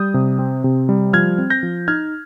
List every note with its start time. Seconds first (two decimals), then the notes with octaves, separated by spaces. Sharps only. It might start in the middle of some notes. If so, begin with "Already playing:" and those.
Already playing: G3 D#6 G6
0.14 C3
0.39 C4
0.64 C3
0.89 G3
1.13 F3 F6 G#6
1.38 C4
1.50 G6 A#6
1.63 F3
1.88 D#4 F6 G#6